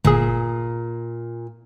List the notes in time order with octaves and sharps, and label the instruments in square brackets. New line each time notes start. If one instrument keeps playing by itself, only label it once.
[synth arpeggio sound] G1 G#4 [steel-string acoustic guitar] A#2